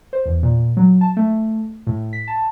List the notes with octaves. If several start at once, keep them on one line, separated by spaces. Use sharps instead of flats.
C5
E2
A#2
F#3
A5
A3
A2
B6
A5